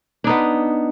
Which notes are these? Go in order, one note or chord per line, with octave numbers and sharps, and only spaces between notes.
B3 D4 D#4